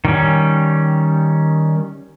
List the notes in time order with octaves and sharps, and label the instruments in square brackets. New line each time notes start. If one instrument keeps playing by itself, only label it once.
[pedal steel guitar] D#3 G3 C#4